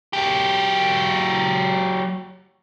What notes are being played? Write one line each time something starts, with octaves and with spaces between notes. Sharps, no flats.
F#3 G4